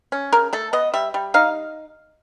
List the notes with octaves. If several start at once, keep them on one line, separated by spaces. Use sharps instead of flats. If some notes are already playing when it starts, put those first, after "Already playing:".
C#4
C#3 A#4
A3 A4
B3 D#5
G3 E5
G3
D#4 F5